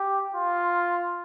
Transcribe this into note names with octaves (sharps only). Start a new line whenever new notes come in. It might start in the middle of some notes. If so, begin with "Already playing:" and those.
Already playing: G4
F4